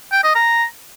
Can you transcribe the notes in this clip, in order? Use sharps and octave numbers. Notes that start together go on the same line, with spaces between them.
G5
D#5
A#5